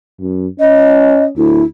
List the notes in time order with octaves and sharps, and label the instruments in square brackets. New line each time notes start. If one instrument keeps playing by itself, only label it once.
[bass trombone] F#2
[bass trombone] C#4 [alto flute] D#5
[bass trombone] D2 [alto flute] E4